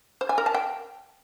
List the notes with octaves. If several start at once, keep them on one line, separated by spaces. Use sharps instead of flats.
C5
G#5
A#4
A5
G5